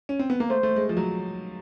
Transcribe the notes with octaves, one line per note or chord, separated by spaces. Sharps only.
C#4
C4
B3
A#3
A3 C5
A3
G#3
F3
F#3